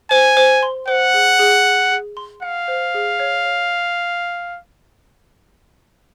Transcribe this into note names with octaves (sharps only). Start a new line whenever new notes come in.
C5 G#5
C5
C6
C5 F#5
G#4
G#4
G#4
G#4
C6
F5 F#5
C5
G#4
C#5
C#5